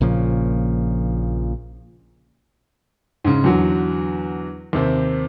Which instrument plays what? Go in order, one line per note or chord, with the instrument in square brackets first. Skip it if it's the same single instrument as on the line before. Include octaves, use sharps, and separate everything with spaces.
[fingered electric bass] A#1 A#2 C#3 F3
[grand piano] G#2 C#3
E2 D3 F#3
D#2 C3 C4